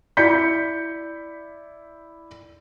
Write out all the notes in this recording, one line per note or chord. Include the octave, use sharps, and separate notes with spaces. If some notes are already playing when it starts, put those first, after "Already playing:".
E4 D5 G6 B6 C#7